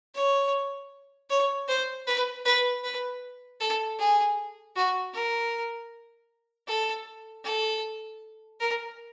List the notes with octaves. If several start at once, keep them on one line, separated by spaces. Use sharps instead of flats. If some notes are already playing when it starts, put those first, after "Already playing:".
C#5
C#5
C5
B4
B4
B4
A4
G#4
F#4
A#4
A4
A4
A#4